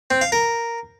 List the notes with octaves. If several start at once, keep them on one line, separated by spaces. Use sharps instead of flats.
C4
F5
A#4